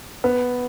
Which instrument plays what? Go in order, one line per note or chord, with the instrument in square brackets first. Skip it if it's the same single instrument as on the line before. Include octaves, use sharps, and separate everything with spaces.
[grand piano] B3